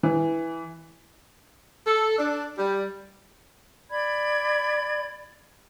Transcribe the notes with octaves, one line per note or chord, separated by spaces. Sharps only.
E3
A4
D4
G3
D5 B5 G#6